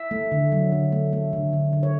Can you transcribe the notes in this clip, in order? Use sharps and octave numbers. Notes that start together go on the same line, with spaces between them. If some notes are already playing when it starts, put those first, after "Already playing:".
Already playing: E5
A3
D3
F#3
D3
A3
A3
D3
D3
D3
C#5